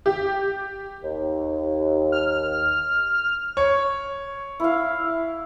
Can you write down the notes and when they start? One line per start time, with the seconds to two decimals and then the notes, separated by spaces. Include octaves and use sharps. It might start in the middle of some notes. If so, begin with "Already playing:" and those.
0.06 G4
1.03 D#2
2.12 F6
3.57 C#5
4.60 E4 F5